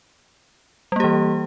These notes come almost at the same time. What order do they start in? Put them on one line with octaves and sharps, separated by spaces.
G3 A#3 G4 E3